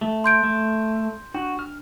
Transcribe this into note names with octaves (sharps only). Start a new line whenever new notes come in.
A3
C6 G6 D7
A3
D4 F#4
F6